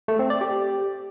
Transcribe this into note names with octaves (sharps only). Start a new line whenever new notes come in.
A3
C4
D5
G4